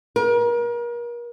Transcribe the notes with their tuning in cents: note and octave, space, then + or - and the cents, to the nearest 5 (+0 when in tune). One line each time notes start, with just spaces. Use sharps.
A#4 +35